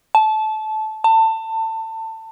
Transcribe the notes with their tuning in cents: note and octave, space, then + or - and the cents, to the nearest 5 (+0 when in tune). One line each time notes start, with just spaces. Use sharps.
A5 -20
A5 +25